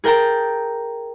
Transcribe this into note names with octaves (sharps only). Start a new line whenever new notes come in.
G#4 A#4 G5 A5 A#5